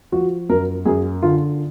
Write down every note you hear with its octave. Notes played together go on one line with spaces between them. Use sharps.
F3 F#4
F#2 A#4
F#2 G#4
D3 F4